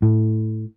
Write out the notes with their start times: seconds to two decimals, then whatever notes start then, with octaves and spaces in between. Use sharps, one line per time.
0.02 A2